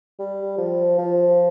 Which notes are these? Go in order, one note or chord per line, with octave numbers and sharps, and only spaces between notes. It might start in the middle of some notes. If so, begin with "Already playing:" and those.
G3
F3
F3